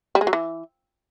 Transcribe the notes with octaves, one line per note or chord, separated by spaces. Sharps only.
G3
G#3
F#3
E3